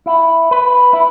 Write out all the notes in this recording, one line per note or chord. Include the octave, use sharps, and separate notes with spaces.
E4
B4
E4